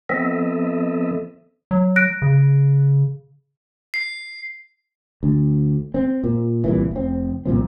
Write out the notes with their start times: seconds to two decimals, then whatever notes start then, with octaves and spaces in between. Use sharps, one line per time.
0.09 F3 B3 C4 A4 D#5 E5
1.71 F#3
1.96 F#6 A#6 D7
2.22 C#3
3.94 C7
5.23 D2
5.94 C4
6.24 A#2
6.64 C2 A#2 E3
6.91 F1 C4
7.46 C2 A#2 F3 C4